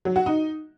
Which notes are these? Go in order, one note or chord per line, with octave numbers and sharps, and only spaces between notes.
F#3
F#4
D#4